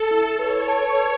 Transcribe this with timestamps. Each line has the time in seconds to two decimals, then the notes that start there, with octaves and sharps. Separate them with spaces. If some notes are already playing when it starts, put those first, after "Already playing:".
Already playing: A4
0.11 E4
0.39 B4 C#5
0.68 A5
0.96 B4